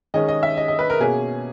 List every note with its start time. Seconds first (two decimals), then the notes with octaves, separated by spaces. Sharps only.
0.14 D#3 G#3 C#4 D#5
0.29 D#5
0.43 E5
0.57 D#5
0.68 D#5
0.79 B4
0.90 A#4
1.00 B2 A#3 C#4 G#4